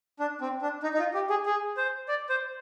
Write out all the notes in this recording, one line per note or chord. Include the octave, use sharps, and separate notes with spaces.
D4
C4
D4
D#4
D#4
F4
G4
G#4
G#4
C5
D5
C5